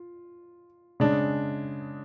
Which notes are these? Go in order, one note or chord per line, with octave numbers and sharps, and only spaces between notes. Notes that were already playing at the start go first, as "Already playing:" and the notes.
Already playing: F4
C#3 G#3 D4